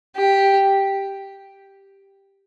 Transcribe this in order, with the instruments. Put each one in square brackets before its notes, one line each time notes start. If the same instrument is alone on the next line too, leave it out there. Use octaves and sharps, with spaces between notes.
[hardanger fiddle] G4